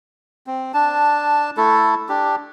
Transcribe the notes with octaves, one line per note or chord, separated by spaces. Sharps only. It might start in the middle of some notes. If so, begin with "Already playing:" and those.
C4
D4 A5
A3 E4 A4
D4 G4